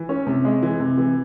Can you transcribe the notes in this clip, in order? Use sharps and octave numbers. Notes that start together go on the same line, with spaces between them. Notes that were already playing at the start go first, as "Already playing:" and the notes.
Already playing: E3
C#4
C3
G#3
E3
C3
E3